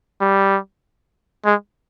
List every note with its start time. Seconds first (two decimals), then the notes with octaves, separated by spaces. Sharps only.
0.21 G3
1.45 G#3